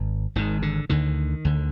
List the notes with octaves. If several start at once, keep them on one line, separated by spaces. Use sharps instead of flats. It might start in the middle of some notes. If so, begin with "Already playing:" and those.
Already playing: G#1
G#1 G#2 D#3
D3
D2 D3 D#3
D2 D3